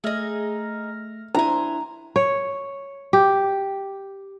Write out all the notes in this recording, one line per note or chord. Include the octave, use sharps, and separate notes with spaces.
A3 D#4 G#4 E5 F6 A#6
D4 E4 C5 G#5 A#5
C#5
G4